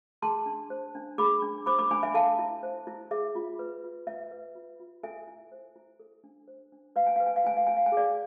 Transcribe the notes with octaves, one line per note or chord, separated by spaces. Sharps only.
G#4 A5 C6
D4
C5
D4
G#4 B5 D6
D4
C5 B5 D6
B5 D6
D4 G#5 B5
E5 G#5
A4 F5 A5
E4
C5
E4
G#4 E5
F4
B4
F4
B4 E5
B4
F4
F4
A4 E5 G#5
E4
C5
E4
A4
D4
C5
D4
B4 F5
G#5
B4 F5
G#5
F5
E4 G#5
F5
E4 G#5
F5
G#5
G#4 D5 F5